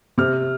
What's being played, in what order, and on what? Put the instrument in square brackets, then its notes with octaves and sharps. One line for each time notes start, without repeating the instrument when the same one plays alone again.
[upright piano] C3 F6